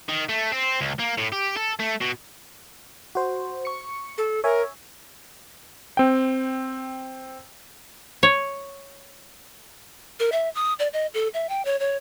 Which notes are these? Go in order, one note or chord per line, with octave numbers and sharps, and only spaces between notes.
D#3
A3
C4
C#2
A#3
A2
G4
A4
A3
B2
F#4 C5
C#6 C#7
A4
A#4 C#5 E5 G#5
C4 G5
C#5
A#4
E5
D#6
D5
D#5
A4
E5
G5
C#5
C#5